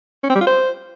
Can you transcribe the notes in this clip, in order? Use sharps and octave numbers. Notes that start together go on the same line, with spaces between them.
C#4
C4
G3
F4
C5